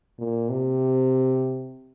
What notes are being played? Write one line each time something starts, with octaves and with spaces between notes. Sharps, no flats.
A#2
C3